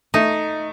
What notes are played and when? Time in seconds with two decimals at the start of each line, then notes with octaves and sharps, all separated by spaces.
0.14 A3 D#4